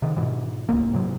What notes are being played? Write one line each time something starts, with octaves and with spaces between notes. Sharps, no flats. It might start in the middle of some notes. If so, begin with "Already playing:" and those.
C3 D#3
G#2 B2 E3
D1 C2 A#3
D2 G#2 C3 F#3